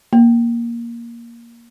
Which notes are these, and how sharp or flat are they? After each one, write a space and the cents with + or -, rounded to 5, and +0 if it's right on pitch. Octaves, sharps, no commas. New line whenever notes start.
A#3 +10